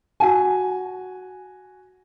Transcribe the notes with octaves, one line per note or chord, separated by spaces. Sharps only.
F#4 G#5